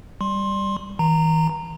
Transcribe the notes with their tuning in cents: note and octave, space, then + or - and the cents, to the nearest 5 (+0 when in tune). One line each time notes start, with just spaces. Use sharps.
G3 +0 C6 +15
E3 -45 A#5 -15